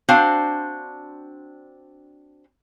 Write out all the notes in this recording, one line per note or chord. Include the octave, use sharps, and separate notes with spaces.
C4 D4 F#4 C5 F5